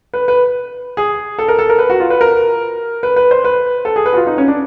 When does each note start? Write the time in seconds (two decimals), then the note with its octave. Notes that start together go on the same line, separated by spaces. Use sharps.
0.14 B4
0.28 B4
0.97 G#4
1.39 A4
1.48 A#4
1.59 A4
1.69 A#4
1.79 B4
1.90 F#4
2.00 F4
2.10 B4
2.21 A#4
3.03 B4
3.16 B4
3.31 C5
3.45 B4
3.85 A4
3.96 G#4
4.06 B4
4.13 F#4
4.16 F4
4.27 D#4
4.38 C#4
4.48 D4